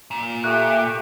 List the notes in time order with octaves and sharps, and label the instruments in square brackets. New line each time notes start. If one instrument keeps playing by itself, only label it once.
[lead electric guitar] A#2
[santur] A3 G4 [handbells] F#6